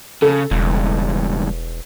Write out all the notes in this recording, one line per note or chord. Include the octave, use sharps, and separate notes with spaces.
C#3 A4
E1 C#2 G2